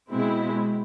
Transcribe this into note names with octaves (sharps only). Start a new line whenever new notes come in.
B2 G#3 C4 E4